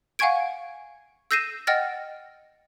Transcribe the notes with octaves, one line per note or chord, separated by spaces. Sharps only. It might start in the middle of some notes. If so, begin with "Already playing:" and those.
F5 F#5 G#5 C#6 G#6 D7
E6 G6 A#6 C7 D#7 E7
D#5 F#5 G5 F6 A6 A#6